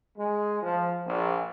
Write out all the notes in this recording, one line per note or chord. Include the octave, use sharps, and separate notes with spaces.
G#3
F3
A#1